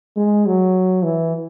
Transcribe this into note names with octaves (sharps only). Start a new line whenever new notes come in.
G#3
F#3
E3